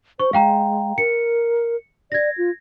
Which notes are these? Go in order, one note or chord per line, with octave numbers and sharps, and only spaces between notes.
C5 C#6
G#3 F5 G5 A#5
A#4 C#7
D5 G#6 A#6
F4